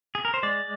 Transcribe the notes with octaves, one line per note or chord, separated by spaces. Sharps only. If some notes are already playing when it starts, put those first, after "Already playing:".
G#4
A#4
C5
G#3 D5